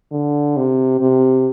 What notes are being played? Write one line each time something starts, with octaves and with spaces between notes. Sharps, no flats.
D3
C3
C3